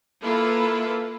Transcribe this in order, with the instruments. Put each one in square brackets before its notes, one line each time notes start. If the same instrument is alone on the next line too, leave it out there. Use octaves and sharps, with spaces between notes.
[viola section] A#3 E4 F4 A4 B4